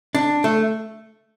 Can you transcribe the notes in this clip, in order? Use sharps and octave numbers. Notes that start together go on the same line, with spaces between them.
D4
A3